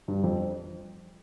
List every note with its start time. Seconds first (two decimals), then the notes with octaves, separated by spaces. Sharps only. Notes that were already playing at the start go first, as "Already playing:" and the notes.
0.08 G2
0.23 F2